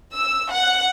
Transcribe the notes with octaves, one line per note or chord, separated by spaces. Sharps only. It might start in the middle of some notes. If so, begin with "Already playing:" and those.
E6
F#5